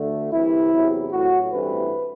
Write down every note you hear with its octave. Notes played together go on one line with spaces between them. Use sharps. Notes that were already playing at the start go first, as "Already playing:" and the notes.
Already playing: D2 D3 A3
C2 C3 E3 E4
E2 C3 F#3
A1 A2 F#3 F#4
A1 G2 E3 A3 C4 B4